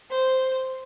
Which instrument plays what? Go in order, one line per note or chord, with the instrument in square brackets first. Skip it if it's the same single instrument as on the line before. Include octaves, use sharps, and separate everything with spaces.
[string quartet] C5